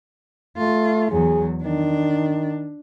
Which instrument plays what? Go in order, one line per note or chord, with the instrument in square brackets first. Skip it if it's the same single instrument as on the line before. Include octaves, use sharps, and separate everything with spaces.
[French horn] A3 [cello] F4
[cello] E2 F#3 [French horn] G#4
[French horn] D#3 [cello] D4